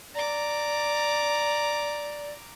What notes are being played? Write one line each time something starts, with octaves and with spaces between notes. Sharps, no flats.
D5 A#5 D6